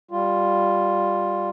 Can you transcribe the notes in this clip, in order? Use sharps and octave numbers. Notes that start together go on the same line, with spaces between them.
G3 F4